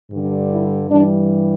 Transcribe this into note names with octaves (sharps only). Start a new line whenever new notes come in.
G2 D3 G3
E4
G2 E3 G3 D4